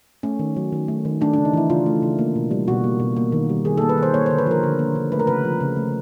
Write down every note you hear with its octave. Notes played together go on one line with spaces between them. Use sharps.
A3 C#4
D#3
F#3
D#3
A3
D#3
A3 D4
C#3 D4
D#4
E3 E4
C#3 F4
A3
C#3
A#3
B2
G3
B2 F#4
A#3
B2
A#3
D#3
G3
D#3 G#4
A#3 A4
B4
D#3
C5
A#3 C#5
D3 C5
B4
F3 A#4
D3
A#3
D3
A3 B4
A#4
C#3 B4
F3
C#3
A3